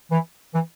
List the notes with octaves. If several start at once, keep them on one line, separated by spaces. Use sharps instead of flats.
E3
E3